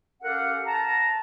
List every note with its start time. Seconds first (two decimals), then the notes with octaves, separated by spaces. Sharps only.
0.23 C#4 G4 A4 A#4 F5 F#5
0.66 A5 A#5